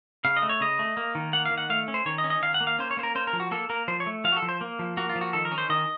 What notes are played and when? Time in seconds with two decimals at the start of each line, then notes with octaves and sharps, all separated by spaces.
0.25 C#3 F5
0.37 D#5
0.42 A3
0.49 C#5
0.60 C#3 D#5
0.79 A3
0.97 A#3
1.15 D#3
1.33 A#3 F#5
1.46 F5
1.51 D#3
1.58 F#5
1.70 A3 F5
1.88 C#4
1.94 C5
2.06 D#3 C#5
2.18 D#5
2.24 C#4
2.30 D#5
2.42 D#3 F5
2.54 F#5
2.61 A#3
2.67 F5
2.79 C#4 C5
2.91 C#5
2.97 A#3 C5
3.03 A#4
3.15 C#4 C5
3.27 A#4
3.33 F3
3.40 F#4
3.51 A#3 A4
3.69 A#3 A#4
3.88 F3 C5
4.00 C#5
4.06 A3
4.24 F3 F5
4.32 F#4
4.37 A4
4.42 F3
4.49 C5
4.61 A#3
4.79 F3
4.97 A#3 F#4
5.09 F4
5.15 F3
5.21 F#4
5.33 D#3 A4
5.45 A#4
5.52 C#4
5.58 C5
5.69 D#3 D#5